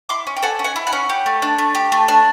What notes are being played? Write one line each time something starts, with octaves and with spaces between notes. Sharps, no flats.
E4 C6 D6
C#4
G5
A4 F#5 G#5
C#4
F#5 G#5
E4
F#5 G#5
C#4
G4
A3
D4
A3
G4
A3
D4